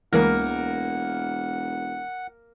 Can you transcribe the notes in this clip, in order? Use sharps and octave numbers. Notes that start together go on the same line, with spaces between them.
E1 C#2 E3 G#3 A#3 A#4 F#5